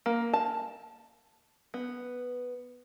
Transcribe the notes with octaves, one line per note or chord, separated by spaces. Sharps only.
A#3
A5
B3